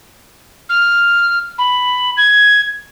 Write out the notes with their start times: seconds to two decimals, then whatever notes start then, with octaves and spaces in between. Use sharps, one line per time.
0.69 F6
1.58 B5
2.17 G#6